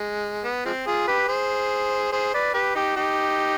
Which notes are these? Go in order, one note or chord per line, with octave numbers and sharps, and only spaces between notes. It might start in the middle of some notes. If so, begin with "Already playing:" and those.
Already playing: G#3
B3
F3 G#3 C4
F4 G#4
G4 B4
G#4 C5
G#4 C5
B4 D5
G4 B4
D#4 G4
D#4 G4